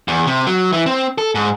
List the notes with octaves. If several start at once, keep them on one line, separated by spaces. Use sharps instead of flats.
E2
C3
F#3
E3
C4
A4
G#2